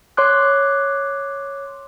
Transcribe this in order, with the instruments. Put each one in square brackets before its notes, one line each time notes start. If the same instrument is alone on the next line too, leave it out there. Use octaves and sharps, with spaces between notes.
[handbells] C#5 C6 D6 F#6